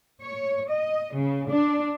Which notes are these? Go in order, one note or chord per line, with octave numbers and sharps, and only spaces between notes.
C#5
D#5
C#3
D4